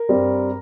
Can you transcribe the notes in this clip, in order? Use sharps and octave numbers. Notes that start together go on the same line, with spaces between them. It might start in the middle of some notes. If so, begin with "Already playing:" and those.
Already playing: A#4
G2 G3 C4